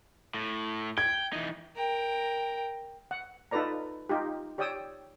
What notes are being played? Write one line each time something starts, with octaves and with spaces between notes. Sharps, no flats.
A2
G5 G#6
E3 D#4
A#4 G5
F#5
D#4 F4 A4 B4 D5 A#5
D#4 F4 G4
G4 C#5 D5 G5 D#6 E6